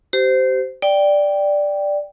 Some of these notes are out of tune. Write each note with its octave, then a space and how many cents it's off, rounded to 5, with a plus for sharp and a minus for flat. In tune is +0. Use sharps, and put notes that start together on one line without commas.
G4 -30 C5 -15
D5 +0 G5 +0